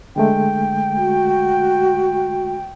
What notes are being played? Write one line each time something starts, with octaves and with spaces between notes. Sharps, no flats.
D3 G#3 A3 G5
F#4